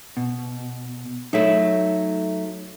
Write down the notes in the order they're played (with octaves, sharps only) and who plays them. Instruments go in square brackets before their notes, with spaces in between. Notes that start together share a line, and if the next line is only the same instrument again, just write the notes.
[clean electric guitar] B2
[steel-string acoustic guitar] F#3 A3 [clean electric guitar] D#4 E5